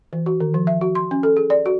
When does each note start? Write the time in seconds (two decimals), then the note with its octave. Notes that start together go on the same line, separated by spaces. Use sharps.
0.13 E3
0.26 F#4
0.40 D#3
0.54 F3
0.67 E5
0.81 F#4
0.95 C6
1.11 C#4
1.23 A4
1.37 G#4
1.50 D5
1.66 F#4